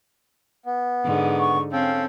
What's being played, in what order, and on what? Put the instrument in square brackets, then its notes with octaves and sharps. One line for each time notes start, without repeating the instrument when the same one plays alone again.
[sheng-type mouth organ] B3
[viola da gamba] G#2 D3
[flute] C#6
[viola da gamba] C4 [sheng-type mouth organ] C#4 A4 G5 [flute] F5